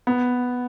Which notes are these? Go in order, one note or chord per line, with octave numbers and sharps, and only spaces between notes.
B3